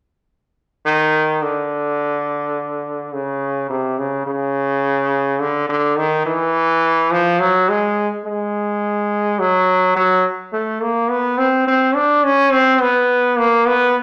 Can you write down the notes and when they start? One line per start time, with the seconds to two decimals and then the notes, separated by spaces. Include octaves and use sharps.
0.86 D#3
1.42 D3
3.13 C#3
3.70 C3
3.98 C#3
4.27 C#3
5.40 D3
5.69 D3
5.98 D#3
6.26 E3
7.11 F3
7.40 F#3
7.69 G#3
8.25 G#3
9.39 F#3
9.96 F#3
10.53 A3
10.81 A#3
11.10 B3
11.38 C4
11.67 C4
11.95 D4
12.24 C#4
12.52 C4
12.81 B3
13.38 A#3
13.66 B3